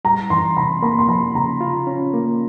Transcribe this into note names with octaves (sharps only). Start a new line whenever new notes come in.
G3 A#5
E3 C6
C3 B5
A#3 B5
C6
F3 B5
C#3 A#5
F4
C#4
A#3